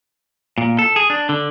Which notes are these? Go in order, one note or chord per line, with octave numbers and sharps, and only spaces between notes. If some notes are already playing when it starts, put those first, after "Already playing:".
A#2
A4
G#4
D4
D3